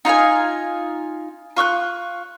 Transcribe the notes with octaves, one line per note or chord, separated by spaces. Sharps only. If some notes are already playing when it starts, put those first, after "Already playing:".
D#4 F4 F5 G#5
F4 C#6 E6 F#6